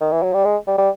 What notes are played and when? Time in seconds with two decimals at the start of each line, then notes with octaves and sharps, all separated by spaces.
0.01 D#3
0.12 E3
0.23 F#3
0.34 G3
0.45 G#3
0.67 G3
0.78 G3